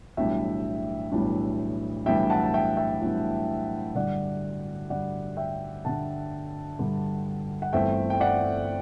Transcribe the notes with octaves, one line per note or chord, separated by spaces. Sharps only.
B1 A2 E3 G3 D4 E5 G5
B1 A2 E3 G3 D4
B1 A2 E3 G3 D4 E5 G5
F#5 A5
A5
E5 G5
E5 G5
B1 A2 E3 G3 D4
G2 D3 G3 D4 D5 F#5
G2 D3 G3 D4 D5 F#5
E5 G5
G2 D3 G3 D4 F#5 A5
G2 D3 G3 D4
F#5
G1 G2 E3 A3 C4 E5 G5
G5
D5 F#5